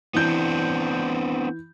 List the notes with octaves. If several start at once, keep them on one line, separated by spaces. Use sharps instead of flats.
E3 B3 C4 D4 G6